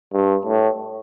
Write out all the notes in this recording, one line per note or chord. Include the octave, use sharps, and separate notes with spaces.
G2
A2